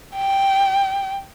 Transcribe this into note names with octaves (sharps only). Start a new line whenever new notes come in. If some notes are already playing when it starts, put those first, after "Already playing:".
G5